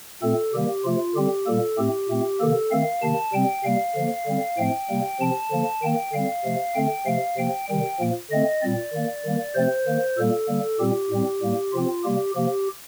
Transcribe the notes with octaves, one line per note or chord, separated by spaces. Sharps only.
A#2 A3 C4 A4
C3 D#3 G3 A#3 G4
C3 F3 A3 F4
D3 G3 C4 G4
A#2 G3 A#3 A4
A2 A3 C4 G4
A#2 A3 C4
C3 D#3 A#3 A4
D#3 A3 C4 F5
C3 D#3 A#3 A5
C3 G3 C4 G5
C3 G3 A#3 F5
D3 F3 A#3
D3 G3 C4
A2 F3 A3 C4 G5
C3 G3 A#3
C3 F3 C4 A5
D3 F3 A#3
D#3 A#3 G5
D3 G3 C4 F5
C3 F3 A3
D3 A3 C4 G5
C3 F3 A3 F5
C3 F3 A#3 G5
C3 D#3 G3 G5
A#2 F3 A#3
D3 A3 C4 D#5
A#2 G3 C4 D5
D#3 A#3
D#3 G3 A#3
C3 F3 A3 C4 C5
D#3 A#3
A#2 G3 A#3 A4
D3 G3 A#3
A#2 G3 C4 G4
A2 G3 C4
A2 G3 A#3
C3 F3 C4 F4
C3 G3 A#3 G4
C3 F3 A#3 G4